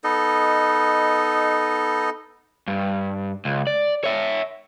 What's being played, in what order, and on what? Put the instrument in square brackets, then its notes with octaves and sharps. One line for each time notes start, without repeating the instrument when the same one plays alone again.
[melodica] B3 D#4 A4 D#5
[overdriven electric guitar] G2
C#2
D5
C#5 E5